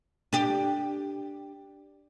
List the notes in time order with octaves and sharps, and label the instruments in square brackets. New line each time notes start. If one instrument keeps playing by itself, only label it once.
[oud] D4 G4